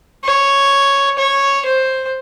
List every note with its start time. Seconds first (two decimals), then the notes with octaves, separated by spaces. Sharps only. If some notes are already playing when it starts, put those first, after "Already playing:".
0.24 C#5
1.18 C#5
1.65 C5